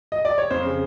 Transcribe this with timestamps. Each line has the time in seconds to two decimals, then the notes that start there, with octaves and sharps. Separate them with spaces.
0.12 D#5
0.25 D5
0.38 C#5
0.50 F2 C5
0.65 C#3